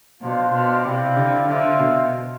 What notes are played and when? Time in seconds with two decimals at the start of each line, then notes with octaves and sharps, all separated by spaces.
0.21 B2 D4 F4 C5 F5
0.53 B2
0.84 C3 C4 E4 G4 D5 F5
1.16 D3
1.48 D3 C4 F4 C5 E5
1.80 B2